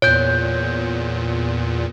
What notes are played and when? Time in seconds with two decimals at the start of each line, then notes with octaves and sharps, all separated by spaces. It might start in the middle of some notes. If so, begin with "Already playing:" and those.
0.02 E2 A#2 C#5 G6